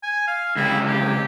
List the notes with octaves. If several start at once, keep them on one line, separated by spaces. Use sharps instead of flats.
G#5
F5
C#2 C3 E4
G4